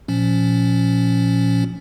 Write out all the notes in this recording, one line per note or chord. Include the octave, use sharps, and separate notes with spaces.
A#2 F3 C#4